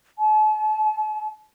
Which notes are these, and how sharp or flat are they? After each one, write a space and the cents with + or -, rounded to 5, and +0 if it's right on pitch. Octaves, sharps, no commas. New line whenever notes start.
A5 -45